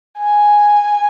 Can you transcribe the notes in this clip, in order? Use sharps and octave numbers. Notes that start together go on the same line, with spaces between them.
G#5